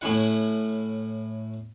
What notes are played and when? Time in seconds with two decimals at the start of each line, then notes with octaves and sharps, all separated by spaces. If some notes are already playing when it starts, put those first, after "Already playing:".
0.01 A2 C#4 E4 F#5